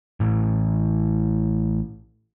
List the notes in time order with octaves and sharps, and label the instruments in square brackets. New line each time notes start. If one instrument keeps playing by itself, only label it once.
[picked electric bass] A1 A2